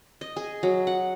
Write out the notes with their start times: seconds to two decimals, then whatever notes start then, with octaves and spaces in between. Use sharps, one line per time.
0.21 D#5
0.36 G#4
0.63 F#3
0.87 F#5